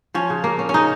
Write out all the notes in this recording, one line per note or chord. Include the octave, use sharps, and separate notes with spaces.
F3 C#4
C#3
A#3
C#4
C#4
C#3 D#4